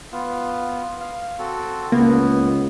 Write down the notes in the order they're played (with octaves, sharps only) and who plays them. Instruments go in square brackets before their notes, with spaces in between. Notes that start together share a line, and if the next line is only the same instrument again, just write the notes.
[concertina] B3 F4
F5
C4 F#4 A4
[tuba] C#2 [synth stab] A#3 [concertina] B3